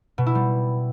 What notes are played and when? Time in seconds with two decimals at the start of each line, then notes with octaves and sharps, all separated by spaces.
0.18 B2
0.26 E4
0.35 G3